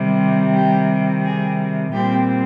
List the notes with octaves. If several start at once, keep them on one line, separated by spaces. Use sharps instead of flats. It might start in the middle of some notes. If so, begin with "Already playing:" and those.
Already playing: C3 D#3 G3
G4
G#4
A#2 G3 C4 G4